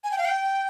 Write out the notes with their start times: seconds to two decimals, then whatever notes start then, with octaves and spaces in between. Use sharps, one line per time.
0.04 G#5
0.11 G5
0.18 F5
0.25 G5